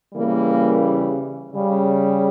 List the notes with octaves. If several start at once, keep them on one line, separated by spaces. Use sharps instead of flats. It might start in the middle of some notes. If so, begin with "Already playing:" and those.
C#3 E3 G3 A#3
C#3 G3